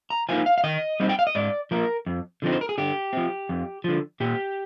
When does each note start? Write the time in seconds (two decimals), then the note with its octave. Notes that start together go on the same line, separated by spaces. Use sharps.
0.10 A#5
0.29 F3 A#3 D#4 G#5
0.46 F5
0.58 F5
0.64 D#3 D#5
1.00 G3 C4 D#4
1.09 G5
1.19 F5
1.27 D#5
1.35 G#2 D5
1.71 F3 A#3 A#4
2.06 F2
2.42 D3 F3 C4 D#4
2.52 C5
2.61 A#4
2.69 G#4
2.78 D3 G4
3.13 F3 C4
3.49 F2
3.84 D3 F3
4.20 A#2 G4